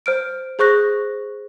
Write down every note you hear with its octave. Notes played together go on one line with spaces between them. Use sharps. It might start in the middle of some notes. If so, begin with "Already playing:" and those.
C5 F6 D7
G#4 C5 C#6 F#6 A#6